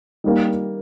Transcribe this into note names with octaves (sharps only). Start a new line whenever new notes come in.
D#3 G3 A#3